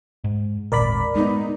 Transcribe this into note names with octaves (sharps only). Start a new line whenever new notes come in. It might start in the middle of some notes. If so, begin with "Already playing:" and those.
G#2
G#1 D#2 A#2 A#4 D5 B5
G#3 B3 D#4